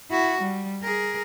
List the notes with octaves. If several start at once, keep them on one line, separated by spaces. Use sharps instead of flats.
E4 F#4
G3
G#4 A#4